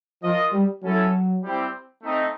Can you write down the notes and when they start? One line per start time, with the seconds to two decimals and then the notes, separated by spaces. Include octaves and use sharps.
0.23 F3 F4 A#4 D#5
0.53 G3
0.83 F#3 C#4 E4 A4
1.43 G3 C4 E4 G4 C5
2.03 A3 C4 D#4